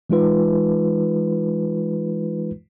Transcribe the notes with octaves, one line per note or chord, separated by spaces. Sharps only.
E3 G#3 D#4 F4 B4